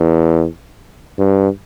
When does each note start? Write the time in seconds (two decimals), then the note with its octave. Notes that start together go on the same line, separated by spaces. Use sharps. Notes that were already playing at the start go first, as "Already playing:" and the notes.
Already playing: E2
1.19 G2